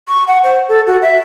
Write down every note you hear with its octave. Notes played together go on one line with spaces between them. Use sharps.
C#6
F#5
C5
A4
F#4
E5